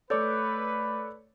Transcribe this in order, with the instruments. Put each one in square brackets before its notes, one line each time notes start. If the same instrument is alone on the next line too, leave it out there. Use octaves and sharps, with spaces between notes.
[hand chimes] A3 D6 G6 [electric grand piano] A4 C#5 D5 [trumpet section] B4